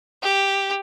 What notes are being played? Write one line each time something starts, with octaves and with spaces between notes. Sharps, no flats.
G4